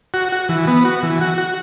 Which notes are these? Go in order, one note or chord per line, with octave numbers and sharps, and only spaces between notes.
F#4
F#4
E3
B3
F#4
E3
F#4
F#4